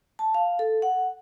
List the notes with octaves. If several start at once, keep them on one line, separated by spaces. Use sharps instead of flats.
A5
F5
A4
F#5